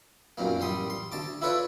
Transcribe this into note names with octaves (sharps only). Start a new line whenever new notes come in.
B1 F#2 A#2 A#3
A1 G3 C6 D#6
C6
D2 A5 D6
E4 F4 A4 B4 C#5 D5